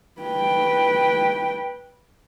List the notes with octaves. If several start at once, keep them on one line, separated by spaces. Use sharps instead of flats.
B4 G5